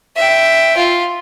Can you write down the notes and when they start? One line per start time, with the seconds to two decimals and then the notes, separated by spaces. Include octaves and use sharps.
0.16 E5 G5
0.77 F4